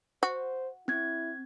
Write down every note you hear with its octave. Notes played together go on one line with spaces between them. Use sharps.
F#4 C5
C4 E4 G#6